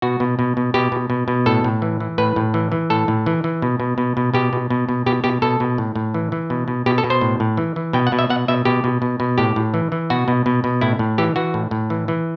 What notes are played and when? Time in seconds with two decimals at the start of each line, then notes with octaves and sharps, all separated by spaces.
0.02 B2 F#4
0.20 B2
0.39 B2
0.57 B2
0.74 B2 G4
0.92 B2
1.10 B2
1.28 B2
1.46 A2 A4
1.64 A2
1.82 E3
2.00 E3
2.18 A2 B4
2.36 A2
2.54 E3
2.72 E3
2.90 A2 A4
3.08 A2
3.26 E3
3.44 E3
3.62 B2
3.80 B2
3.98 B2
4.17 B2
4.34 B2 G4
4.53 B2
4.70 B2
4.89 B2
5.06 B2 G4
5.24 B2 G4
5.42 B2 A4
5.60 B2
5.78 A2
5.95 A2
6.14 E3
6.32 E3
6.50 B2
6.68 B2
6.86 B2 G4
6.98 A4
7.04 B2
7.10 C5
7.21 A2
7.40 A2
7.57 E3
7.76 E3
7.93 B2 G5
8.07 F#5
8.12 B2
8.19 E5
8.30 B2 F#5
8.48 B2 E5
8.65 B2 G4
8.84 B2
9.02 B2
9.20 B2
9.38 A2 G4
9.56 A2
9.74 E3
9.92 E3
10.10 B2 F#4
10.28 B2
10.46 B2
10.64 B2
10.81 A2 E4
10.99 A2
11.18 E3 G4
11.36 E3 F#4
11.54 A2
11.71 A2
11.90 E3
12.08 E3